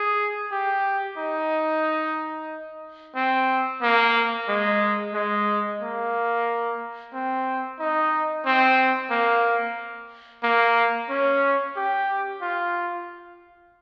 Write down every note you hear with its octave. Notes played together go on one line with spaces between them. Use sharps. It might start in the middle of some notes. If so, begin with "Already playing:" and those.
Already playing: G#4
G4
D#4
C4
A#3
G#3
G#3
A#3
C4
D#4
C4
A#3
A#3
C#4
G4
F4